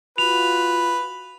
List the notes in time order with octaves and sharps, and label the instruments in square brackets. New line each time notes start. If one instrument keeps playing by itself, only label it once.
[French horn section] F4 F#4 [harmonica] B4 [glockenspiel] F7